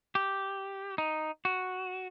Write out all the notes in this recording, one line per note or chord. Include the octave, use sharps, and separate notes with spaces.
G4
D#4
F#4